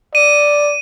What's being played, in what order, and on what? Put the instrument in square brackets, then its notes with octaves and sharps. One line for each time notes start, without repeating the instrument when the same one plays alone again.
[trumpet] D5 [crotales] D#7